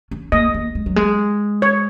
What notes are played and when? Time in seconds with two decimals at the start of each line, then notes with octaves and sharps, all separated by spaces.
0.11 C#4
0.32 A#3 D#5
0.54 A#3
0.75 G#3
0.86 F#3
0.96 G#3
1.62 C#5